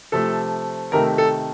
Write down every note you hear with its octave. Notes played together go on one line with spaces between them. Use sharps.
C3 F3 A3 A4
C3 D#3 A3 A#4
A4